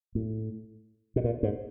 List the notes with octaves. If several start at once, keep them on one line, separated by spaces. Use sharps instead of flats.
A2
B2
A#2
G#2